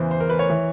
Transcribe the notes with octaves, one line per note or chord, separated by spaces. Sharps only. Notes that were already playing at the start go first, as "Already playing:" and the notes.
Already playing: E2 C#3 E3 C5
C5
A#4
B4
C#5
E3